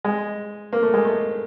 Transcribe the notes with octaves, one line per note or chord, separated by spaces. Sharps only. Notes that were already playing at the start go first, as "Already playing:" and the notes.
G#3
A#3
A3
G#3
A3